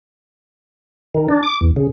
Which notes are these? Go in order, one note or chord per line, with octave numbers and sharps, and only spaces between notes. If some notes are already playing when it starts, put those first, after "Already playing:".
D#3
D4
D6
E2
C#3